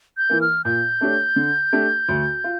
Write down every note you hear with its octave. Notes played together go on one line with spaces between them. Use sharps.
G6
E3 A#3
F6
A#2 G6
A3 D4 G4 C#5
D3
A3 D4 G4
D2
F4